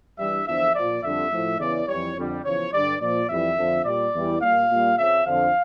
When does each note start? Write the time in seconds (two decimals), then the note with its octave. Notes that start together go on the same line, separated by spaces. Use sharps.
0.19 G2 E3 G3 E5
0.47 E2 D3 F3 E5
0.75 A#2 F3 D5
1.03 F2 D3 G3 E5
1.32 A2 F3
1.60 E2 C#3 E3 D5
1.88 F2 E3 G3 C#5
2.16 F2 D3 G3
2.44 E2 C#3 F3 C#5
2.73 G2 D3 G3 D5
3.01 A#2 F3 D5
3.29 F2 E3 G3 E5
3.57 F2 D3 F3
3.85 A#2 G3 D5
4.14 E2 E3 G3
4.42 A#2 G3 F5
4.70 A#2 G3
4.98 F2 C#3 F3 E5
5.26 F2 D3 F3 F5